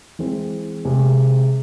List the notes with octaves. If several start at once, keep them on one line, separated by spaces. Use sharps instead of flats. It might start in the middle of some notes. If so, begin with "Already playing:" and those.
E3 G#3 C4
C3 G#3 C4 G#4